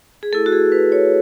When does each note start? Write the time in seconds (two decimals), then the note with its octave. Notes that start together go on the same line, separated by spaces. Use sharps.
0.23 G#4
0.32 A3 E4 A4
0.46 F#4
0.52 G#4
0.72 B4
0.92 C#5